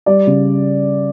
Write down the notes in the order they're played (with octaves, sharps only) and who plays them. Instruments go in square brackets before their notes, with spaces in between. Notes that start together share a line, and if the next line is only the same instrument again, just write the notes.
[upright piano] G3 D5
C#3